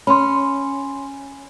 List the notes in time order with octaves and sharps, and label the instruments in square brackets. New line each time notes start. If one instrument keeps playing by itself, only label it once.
[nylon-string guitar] C#4 [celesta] B5 C6